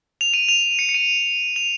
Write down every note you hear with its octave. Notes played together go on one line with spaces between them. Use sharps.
F7
D#7
F7
C#7
C#7
D#7
F7